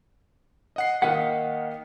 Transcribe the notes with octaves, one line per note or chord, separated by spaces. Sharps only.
D#5 F#5 C7
D#3 A#3 D#5 F5 F#5 B6